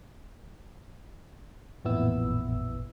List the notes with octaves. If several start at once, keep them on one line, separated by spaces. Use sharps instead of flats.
A1 F2 A#2 B3 E4 E6